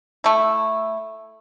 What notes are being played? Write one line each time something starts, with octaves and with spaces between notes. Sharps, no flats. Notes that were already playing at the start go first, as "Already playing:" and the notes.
A3 E4